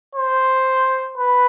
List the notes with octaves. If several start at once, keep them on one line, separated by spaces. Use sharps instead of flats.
C5
B4